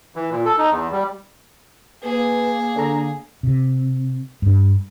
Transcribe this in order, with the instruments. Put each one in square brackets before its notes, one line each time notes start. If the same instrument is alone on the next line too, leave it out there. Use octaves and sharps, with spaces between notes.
[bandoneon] E3
A#2
A4
D#4
E2
G3
[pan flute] A#3 [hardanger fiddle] G#4 [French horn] B4
[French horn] D3 [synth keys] D4 A4 A#5
[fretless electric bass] C3
G2